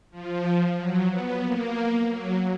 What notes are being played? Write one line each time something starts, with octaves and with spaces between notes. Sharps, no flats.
F3
F#3
B3
A#3
F#3